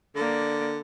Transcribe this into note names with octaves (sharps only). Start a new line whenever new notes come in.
D3 A#3 D5